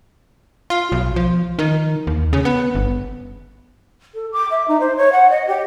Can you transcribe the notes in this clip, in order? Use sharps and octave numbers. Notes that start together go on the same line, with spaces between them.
F4
B1
F3
D#3
D#2
C#3
B3
G1
A4
D6
E5
D#4
C5
C#5
F#5
D#5
G4